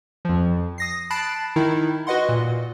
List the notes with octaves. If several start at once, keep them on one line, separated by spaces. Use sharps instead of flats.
F2 F3
D#6 A#6 C7
A5 B5 F#6 A6 C7 D7
D#3 D#4 E4
F#4 B4 D#5 F#5 C6
A#2